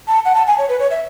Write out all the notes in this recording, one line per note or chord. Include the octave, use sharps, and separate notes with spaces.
A5
F#5
A5
G#5
C#5
B4
C#5
E5